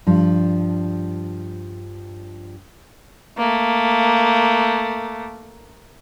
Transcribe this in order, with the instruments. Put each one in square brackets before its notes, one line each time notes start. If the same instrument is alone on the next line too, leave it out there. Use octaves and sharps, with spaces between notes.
[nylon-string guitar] G2 F3
[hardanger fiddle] A3 A#3